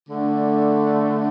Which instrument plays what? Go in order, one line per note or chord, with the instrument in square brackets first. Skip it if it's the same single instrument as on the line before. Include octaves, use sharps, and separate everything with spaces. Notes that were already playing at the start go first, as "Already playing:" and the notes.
[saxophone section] D3 A3 D4